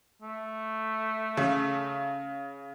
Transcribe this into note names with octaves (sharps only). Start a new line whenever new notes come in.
A3
C#3